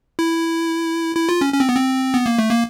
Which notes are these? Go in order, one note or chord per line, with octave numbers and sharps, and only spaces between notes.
E4
E4
F4
C#4
C#4
C4
B3
C4
B3
A#3
A3
A#3